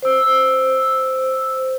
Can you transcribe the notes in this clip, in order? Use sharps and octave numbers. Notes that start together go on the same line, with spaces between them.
C5 E6